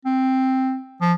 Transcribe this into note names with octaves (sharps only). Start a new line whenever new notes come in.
C4
F3